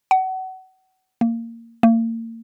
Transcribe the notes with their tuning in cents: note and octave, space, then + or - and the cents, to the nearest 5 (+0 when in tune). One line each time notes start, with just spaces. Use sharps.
F#5 +30
A#3 -20
A#3 -40